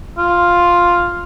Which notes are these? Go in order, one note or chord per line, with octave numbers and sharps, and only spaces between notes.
F4